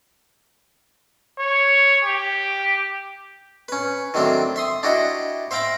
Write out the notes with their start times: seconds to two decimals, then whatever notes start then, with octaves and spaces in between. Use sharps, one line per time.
1.38 C#5
2.04 G4
3.68 C#4 B4
4.14 D#3 F#3 A3 C4 D4
4.56 E5 C6 D#6
4.83 D4 E4 F#4 G4 D#5
5.51 C5 E5 F5 G5 A#5 B5